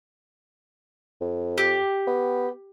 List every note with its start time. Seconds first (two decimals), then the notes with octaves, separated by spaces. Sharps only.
1.21 F2
1.58 G4
2.07 B3